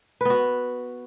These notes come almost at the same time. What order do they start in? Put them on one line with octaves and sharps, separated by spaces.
B4 B3 F#4